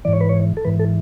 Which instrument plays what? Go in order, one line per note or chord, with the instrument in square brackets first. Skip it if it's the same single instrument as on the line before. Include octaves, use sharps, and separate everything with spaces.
[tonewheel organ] G#2 E3 D5
C#5
B4
C#5
A4
G#2 E3 B4
A4